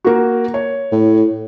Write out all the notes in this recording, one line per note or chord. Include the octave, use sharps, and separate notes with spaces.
A#3 F#4
C#5
A2